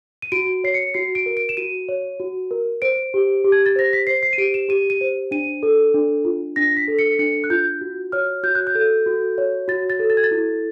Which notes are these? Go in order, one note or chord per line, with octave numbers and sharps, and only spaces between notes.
D#7
F#4 D7
C#5 C7
C#7
F#4 C7
D7
A#4
D7
E7
F#4 D#7
C#5
F#4
A#4
C5 D7
G4
G4
G#6
A6
C5 A#6
B6
C5 C7
C7
D#7
G4 D7
E7
G4 D#7
D#7
C5
D4 D#7
A4
D4
F4
D4 A#6
B6
A4
C#7
D4 C#7
F#6
F4 G6
F#4
C#5 F6
F#4 G6
F#6
G6
A4
F#4
C#5
F#4 A6
A6
A4
A6
G#6
A6
E4